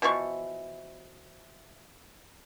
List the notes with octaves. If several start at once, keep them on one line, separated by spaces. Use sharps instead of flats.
B2 E3 F3 C#6